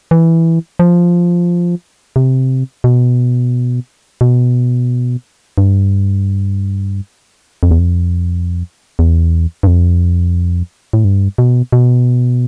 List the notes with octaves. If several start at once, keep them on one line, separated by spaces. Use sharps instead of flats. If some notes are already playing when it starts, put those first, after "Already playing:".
E3
F3
C3
B2
B2
G2
F2
E2
F2
E2
G2
F2
A2
G2
B2
B2